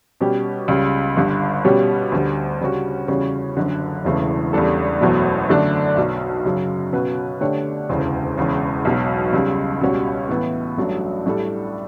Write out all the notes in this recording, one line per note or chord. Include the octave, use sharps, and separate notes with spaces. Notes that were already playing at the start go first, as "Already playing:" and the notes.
B2 G3 C#4 G4
C#2 C#3 G3
G1 G2 D3
B2 G3 C#4 G4 C#5
D2 D3 G3
C#3 G3 C#4 F#4
E2 C#3 G3 C#4 F#4
F#1 F#2 D3
E1 E2 C#3 E3 A3
E2 C#3 G3 D4 A4
F#1 E2 B2 F#3 A3
F#2 D3 A3 D4
B1 B2 F#3
F#2 C#3 F#3
B2 F#3 C#4 F#4 B4
D3 A3 D4 G4 C#5
E1 D2 C#3 E3
E1 E2 C#3
B1 B2 F#3
C#2 C#3 G3
C#2 B2 G3 C#4 F#4
A2 E3 B3 E4
A1 G2 F#3 A3 D4
A2 G3 D4 A4